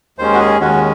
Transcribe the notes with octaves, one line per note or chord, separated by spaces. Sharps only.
D#2 D#3 G#3 C#4 C5
F#4
G#4
D#2 D#3 G#3 C#4 F#4